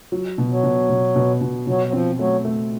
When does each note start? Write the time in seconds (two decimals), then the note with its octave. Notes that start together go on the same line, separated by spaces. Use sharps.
0.12 F#3
0.38 B2
0.51 F#3
0.64 B2
0.89 B2
1.16 B2
1.41 B2
1.67 B2 F#3
1.86 F#3
1.93 F3 C4
2.19 F#3 A3
2.45 A3